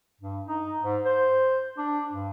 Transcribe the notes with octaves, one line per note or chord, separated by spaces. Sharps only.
G2
D#4
G#2
C5
D4
G2